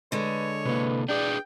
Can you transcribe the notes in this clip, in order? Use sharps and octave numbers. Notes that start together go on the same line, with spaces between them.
D3 G#3 B4 C#5
C3 A#3 B4
D4 G#4 B4 D5 G5